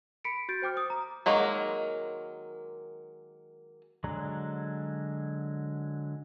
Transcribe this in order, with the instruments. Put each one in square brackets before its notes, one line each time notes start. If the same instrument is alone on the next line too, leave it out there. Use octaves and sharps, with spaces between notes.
[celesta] B5 B6 C#7 D7
F#4 G6 A6 D7
C5 G5 D6 F6
D#6
A#5
[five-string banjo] D#3 F#3 G#3 A#3
[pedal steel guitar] D3 F#3 G#3 D5 A#5